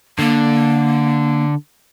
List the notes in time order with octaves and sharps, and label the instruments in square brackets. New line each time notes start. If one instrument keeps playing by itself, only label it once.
[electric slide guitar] D3 [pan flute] A#3